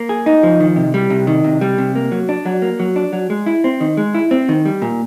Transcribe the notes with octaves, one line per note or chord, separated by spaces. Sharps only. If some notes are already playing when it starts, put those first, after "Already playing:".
Already playing: A#3
G#4
D#4
F3
D#3
C3
G3
C3
D#3
C3
G3
C3
A#3
F#3
D4
F#3
A#3
F#3
D4
F#3
G#3
E4
C4
D#3
G#3
E4
C4
D#3
G3
A#2